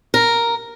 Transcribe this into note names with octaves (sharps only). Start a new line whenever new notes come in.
A#4